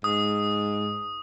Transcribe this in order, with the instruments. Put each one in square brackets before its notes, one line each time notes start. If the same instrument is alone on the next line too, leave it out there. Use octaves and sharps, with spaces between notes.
[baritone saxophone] G#2 [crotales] D#6